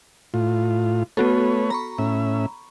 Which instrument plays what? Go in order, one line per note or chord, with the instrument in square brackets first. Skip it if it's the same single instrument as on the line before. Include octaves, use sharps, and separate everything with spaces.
[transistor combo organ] A2 F4
[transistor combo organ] A3 B4 C#5 [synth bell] B3 F#4 A4
[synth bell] A#5 B5 C#6
[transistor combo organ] A2 C#4 E5